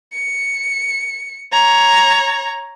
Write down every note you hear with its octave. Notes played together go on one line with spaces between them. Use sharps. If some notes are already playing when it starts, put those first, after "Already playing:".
C#7
C#5 A#5